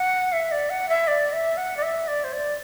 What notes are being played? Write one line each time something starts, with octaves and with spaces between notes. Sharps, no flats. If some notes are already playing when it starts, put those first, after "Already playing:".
Already playing: F#5
E5
D5
F#5
E5
D5
E5
F#5
D5
E5
D5
C5
D5